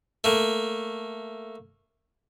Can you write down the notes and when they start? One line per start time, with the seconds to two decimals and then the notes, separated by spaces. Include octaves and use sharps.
0.24 A3 A#3